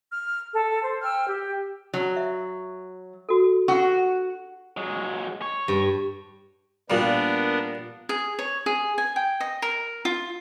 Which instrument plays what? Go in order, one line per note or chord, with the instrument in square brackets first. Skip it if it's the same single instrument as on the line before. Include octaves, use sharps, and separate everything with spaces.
[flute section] F6
A4
C5
G5 E6 F6
G4
[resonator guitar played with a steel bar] F#3
[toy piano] E5
F#4 A4
[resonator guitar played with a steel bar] F#4 [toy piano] F#5 C#6
[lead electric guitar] F#3 G#3
C#5
[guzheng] G2
[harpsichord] A#2 G3 [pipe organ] B3 D4 A#4
[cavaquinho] G#4
C#5
G#4
G#5
G5
D#5
A#4
F4